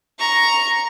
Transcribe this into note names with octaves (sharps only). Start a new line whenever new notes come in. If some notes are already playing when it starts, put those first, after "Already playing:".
A#5 C#6